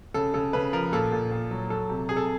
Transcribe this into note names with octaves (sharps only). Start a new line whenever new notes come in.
C#3 A4
C#3 A4
C#3 B4
F3 A#4
A#2 A4
A#2
A#2
F#3
F#3 A4
C3
C3 G#4
A4